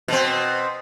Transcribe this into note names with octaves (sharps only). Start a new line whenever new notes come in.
B2 C4